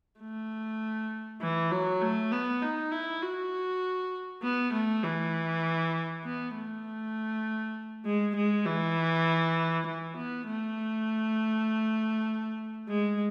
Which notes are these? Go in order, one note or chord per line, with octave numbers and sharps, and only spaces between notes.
A3
E3
F#3
A3
B3
D#4
E4
F#4
B3
A3
E3
B3
A3
G#3
G#3
E3
E3
B3
A3
G#3